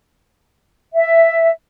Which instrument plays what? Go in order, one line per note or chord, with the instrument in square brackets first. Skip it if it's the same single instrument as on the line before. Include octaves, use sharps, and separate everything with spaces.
[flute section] E5